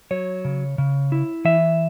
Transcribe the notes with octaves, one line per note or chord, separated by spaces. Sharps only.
F#3 C#5
C#3
C#3
E4
E3 E5